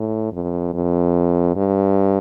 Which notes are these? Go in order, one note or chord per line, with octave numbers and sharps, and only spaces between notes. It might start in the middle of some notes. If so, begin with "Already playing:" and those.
Already playing: A2
F2
F2
G2